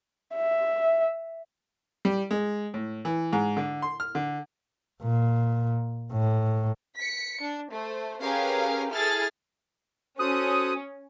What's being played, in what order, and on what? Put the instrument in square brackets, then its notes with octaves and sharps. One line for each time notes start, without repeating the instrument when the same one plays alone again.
[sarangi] E5
[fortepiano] G3
G#3
A2
E3
G#2
D3
C6
F6
D3
[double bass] A#2
A2
[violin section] B6 C#7
D4
A3 C5
C#4 G4 G#4 A#4 B4 F5
E4 G#4 A4 F6 A6
[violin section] C#4 [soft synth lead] F#4 [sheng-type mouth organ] A4 C5 F#6 [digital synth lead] D#6